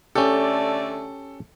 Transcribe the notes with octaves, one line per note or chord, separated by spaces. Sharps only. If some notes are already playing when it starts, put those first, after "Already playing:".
D3 A3 C#4 G4 A4 D5